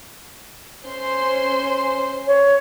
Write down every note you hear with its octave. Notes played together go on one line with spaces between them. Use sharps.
C#4 C5 C6
C#5